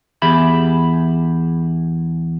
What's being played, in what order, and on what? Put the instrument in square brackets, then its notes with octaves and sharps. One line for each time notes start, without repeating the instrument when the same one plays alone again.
[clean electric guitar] E2 G4 G#4 E5 B5